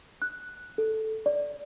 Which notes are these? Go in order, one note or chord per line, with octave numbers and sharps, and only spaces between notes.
F#6
A4
D5